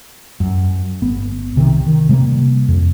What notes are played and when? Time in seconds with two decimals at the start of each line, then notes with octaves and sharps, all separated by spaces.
0.40 F#2
1.02 G1 B3
1.56 C2 C3 D#3
1.87 D#3
2.09 C3 G3 A3 A#3
2.68 F2